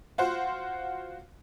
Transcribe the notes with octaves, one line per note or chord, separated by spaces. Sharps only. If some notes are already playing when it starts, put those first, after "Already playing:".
F4 F#4 C5 F#5